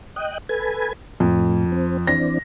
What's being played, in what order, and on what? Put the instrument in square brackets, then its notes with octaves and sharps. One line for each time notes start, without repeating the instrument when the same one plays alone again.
[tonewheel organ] D#5 G5 F#6
A4 B4 G#5
[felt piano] F2 [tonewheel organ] A2
[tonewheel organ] C4
[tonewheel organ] E3 C4 D4 [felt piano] A#6